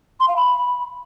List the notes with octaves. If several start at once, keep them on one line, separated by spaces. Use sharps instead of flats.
C6
F5
B5